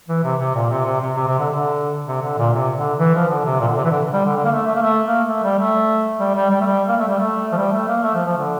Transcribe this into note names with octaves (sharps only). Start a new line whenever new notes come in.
E3
C3
C3
A#2
C3
C3
C3
C3
C3
D3
D3
C3
D3
A#2
C3
D3
E3
F3
D3
C3
A#2
D3
C3
E3
D3
G3
D3
D3
A#3
A3
A3
A#3
A3
A#3
A3
G3
A3
G3
G3
G3
A3
G3
A#3
A3
G3
A3
F3
G3
A3
A#3
A3
F3
F3
D3